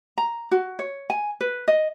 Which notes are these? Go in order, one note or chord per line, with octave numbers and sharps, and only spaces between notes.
A#5
F#4
C#5
G#5
B4
D#5